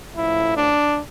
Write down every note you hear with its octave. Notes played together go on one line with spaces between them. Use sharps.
A1 A2 F3 E4
D4